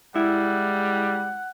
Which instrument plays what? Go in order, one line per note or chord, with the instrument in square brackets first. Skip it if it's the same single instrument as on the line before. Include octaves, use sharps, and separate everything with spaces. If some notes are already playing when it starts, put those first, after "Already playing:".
[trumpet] G3 [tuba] G#3 [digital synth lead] E4 [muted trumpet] F#5